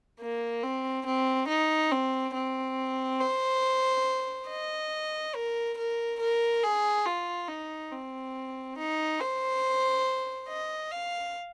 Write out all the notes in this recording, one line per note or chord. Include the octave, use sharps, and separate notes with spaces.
A#3
C4
C4
D#4
C4
C4
C5
D#5
A#4
A#4
A#4
G#4
F4
D#4
C4
D#4
C5
D#5
F5